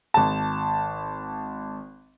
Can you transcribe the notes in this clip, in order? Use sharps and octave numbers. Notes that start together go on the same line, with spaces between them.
G#1 A5